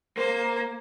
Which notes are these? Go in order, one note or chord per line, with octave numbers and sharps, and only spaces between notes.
A#3 C5